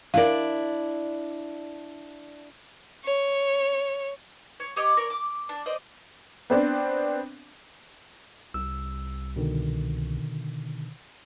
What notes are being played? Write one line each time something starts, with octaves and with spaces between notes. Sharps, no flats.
D4 E4 A#4 D5 F5
C#5
C#5
G4 C#5 D#5
A#4 C#5 D5
D6
D4
C5 D5 D#5
B3 C4 D4
C2 E6
B2 D3 D#3